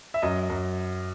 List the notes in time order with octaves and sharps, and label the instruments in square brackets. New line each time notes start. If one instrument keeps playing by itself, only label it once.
[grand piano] E5
F#2 D#5
F#2